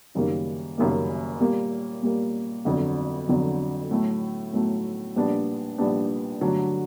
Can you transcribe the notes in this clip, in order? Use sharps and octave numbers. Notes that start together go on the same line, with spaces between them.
F#1 F#2 D#3 G3 A#3
F#1 F#2 D#3 G3 A#3
A#2 G3 A#3
A#2 G3 A#3
G1 F2 D3 F#3
G1 F2 D3 F#3
A2 F#3 A3
A2 F#3 A3
A#1 A#2 G3 B3 D4
A#1 A#2 G3 B3 D4
G2 D3 F#3 A3 D4